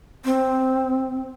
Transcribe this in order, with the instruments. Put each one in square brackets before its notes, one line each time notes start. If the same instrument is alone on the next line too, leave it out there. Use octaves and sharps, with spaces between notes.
[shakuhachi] C4